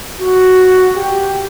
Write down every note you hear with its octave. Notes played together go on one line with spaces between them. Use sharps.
F#4
G4